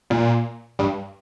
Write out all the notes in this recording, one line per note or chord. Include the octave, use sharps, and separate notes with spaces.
A#2
G2